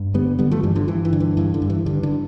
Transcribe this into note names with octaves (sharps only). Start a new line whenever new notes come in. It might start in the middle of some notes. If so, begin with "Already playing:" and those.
Already playing: G2
D3 G3 B3
D3 G3 B3
F3 A3
G2 E3 G3
D3 F3
G2 E3
E3
D3
E3
G2 E3
D3
G2
E3
G2 D3
D3